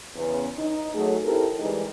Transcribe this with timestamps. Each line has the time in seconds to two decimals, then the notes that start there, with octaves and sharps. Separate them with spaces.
0.16 E2 C#3 B3 C#4
0.58 D#4
0.95 F#3 A3 G#4
1.24 C4 E4 G4 A4 A#4
1.59 E3 G3 G#3 D#4